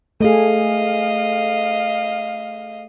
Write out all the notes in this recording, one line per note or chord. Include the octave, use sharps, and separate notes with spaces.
A3 G#4 D#5 F5